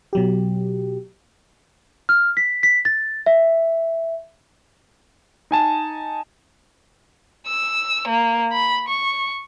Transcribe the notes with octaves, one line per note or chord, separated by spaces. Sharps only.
B2 F#3 G4
F6
B6
B6
A6
E5
D#4 G#5 A5
E6
A#3
B5
C#6